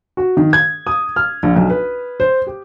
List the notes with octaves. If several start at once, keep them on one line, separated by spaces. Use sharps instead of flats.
F#4
D#3
G#6
D#6
F6
A#1
B1
B4
C5
G4